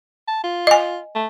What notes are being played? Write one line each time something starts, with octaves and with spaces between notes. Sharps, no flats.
A5
F4
D#5 G#5
A3